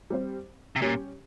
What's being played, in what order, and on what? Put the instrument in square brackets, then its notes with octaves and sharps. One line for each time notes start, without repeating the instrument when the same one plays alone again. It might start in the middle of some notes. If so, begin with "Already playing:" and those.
[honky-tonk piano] G3 C4 G4 C5
[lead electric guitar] C3
[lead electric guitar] A#2 [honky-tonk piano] G3 C#4 G4 C#5